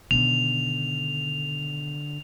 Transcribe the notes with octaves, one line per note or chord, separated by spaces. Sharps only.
B2 D3 D#3 F7